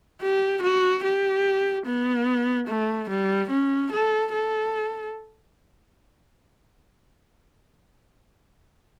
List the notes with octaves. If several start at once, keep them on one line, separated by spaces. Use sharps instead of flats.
G4
F#4
G4
B3
A3
G3
C#4
A4
A4